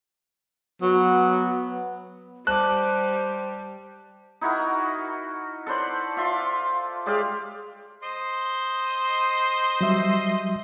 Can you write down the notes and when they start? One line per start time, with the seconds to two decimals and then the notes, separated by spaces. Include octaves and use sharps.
0.82 F#3 B3
2.47 G3 G4 C5 A5 D6 F#6
4.41 D#4 E4 F#4 A#4
5.67 A4 B4 C5 D5
6.17 F4 E5 C6 D6
7.06 G#3 G4 D5 F5
8.03 C5 D#5 C6
9.81 F#3 G3 E5